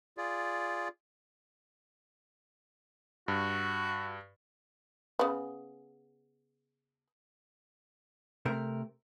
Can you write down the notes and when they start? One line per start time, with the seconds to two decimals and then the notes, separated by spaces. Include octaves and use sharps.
0.17 F4 G#4 D5
3.28 G2 F#4
5.19 C#3 B3
8.45 C3 A3 A#4